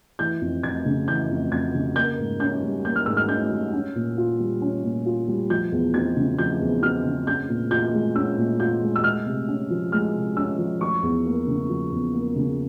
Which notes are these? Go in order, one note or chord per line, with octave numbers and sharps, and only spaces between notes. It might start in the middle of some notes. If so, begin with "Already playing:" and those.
E3 G6
F2
F2 G#6
C#3
E3 G6
F2
F2 G#6
C#3
A#3 G6
G#2
C#4 G6
G3
A#3 G6
F6
G#2 E6
F6
C#4 G6
G3
C#4
A#2
F4
G3
C#4
A#2
F4
G3
F3 G6
E2
C4 G#6
C#3
F3 G6
E2
C4 F6
C#3
C#4 G6
A#2
F4 G6
G#3
C#4 E6
A#2
F4 G6
G#3
E6
G#3 F6
C3
C#4
F3
G#3 F6
C3
C#4 E6
F3
F3 C#6
E2
A#3
C#3
F3
E2
A#3
C#3